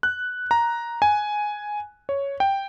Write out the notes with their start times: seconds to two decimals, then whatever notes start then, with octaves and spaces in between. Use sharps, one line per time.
0.03 F#6
0.51 A#5
1.02 G#5
2.09 C#5
2.40 G5